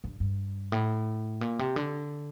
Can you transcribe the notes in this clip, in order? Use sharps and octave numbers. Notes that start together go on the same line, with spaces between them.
G2
G2
A2
A#2
C3
D3